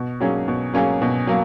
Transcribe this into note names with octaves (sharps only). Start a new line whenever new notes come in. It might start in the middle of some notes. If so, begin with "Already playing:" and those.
Already playing: B2
F#3 A#3 C#4 G#4
B2
F#3 A#3 C#4 G#4
B2
F#3 A#3